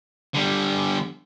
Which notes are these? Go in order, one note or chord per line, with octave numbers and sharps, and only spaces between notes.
D3 G3